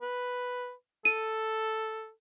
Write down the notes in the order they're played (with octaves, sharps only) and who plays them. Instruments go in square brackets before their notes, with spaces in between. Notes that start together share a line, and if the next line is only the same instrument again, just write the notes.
[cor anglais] B4
[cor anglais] A4 [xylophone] D#7